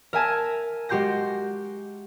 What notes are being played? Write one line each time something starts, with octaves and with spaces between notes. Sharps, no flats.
A#4 E5 G#5 A5
G#3 F#4 G4 C6 G6 A#6